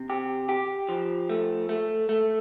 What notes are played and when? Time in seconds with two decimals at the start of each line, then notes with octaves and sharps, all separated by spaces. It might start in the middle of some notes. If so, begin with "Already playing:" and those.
Already playing: C3
0.10 G4
0.49 G4
0.89 F3
1.30 A3
1.69 A3
2.09 A3